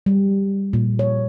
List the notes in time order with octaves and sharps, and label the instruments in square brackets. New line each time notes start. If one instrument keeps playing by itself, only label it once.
[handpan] G3
A#2
C#5